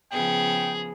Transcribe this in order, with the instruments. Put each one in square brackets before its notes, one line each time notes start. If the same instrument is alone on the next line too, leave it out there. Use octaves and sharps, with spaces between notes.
[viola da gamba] C#3 F3 B3 [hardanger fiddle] G#4 [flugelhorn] G5